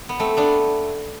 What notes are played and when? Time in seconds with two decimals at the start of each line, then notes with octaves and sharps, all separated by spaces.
0.09 B3
0.19 A3 C4
0.37 B3 D4